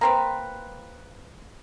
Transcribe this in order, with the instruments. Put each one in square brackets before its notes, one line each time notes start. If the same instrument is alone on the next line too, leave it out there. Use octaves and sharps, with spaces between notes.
[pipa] A#3 C4 B4